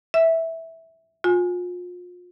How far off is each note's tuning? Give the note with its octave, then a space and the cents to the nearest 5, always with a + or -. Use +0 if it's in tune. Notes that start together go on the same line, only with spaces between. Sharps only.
E5 -10 E6 +25
F4 +35 G#5 +0